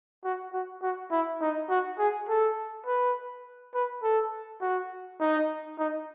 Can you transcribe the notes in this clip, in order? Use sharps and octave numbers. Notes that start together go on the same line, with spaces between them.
F#4
F#4
F#4
E4
D#4
F#4
G#4
A4
B4
B4
A4
F#4
D#4
D#4